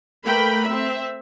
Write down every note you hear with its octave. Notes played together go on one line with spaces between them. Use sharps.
A3 A#3 A#4 B4 G5 B5
C4 E5